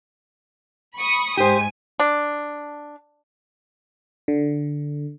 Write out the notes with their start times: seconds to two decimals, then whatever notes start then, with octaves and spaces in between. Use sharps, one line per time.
0.96 B5 C#6 D#6
1.37 G#2 G4 C5 G#5
2.00 D4
4.28 D3